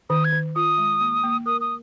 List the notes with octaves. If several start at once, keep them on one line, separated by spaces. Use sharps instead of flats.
D#3 D#6
G#6
D#3
F4 D#6
G#3
A#3
A#3
A#4 D#6
D#6